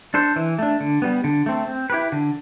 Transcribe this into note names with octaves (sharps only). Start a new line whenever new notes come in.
D4 A4 C5
E3
A3 D4
D3
G3 B3
D3
A3 C4
C4
E4 G4 B4
D3